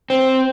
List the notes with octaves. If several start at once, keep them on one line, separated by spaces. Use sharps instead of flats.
C4